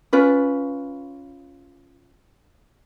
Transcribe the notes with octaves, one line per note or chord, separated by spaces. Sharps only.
C#4 F4 B4